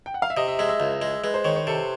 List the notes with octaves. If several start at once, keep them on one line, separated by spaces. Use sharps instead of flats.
G5
F#5
F5
E5
C3 D#5
E5
G#3 E5
E5
C#2
G#3
G#3 B4
C5
D#3 C#5
C#5
C3 A4